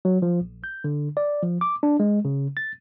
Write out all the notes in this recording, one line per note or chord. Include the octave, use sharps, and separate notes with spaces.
F#3
F3
A#1
G6
D3
D5
F3
D6
D4
G#3
C#3
A6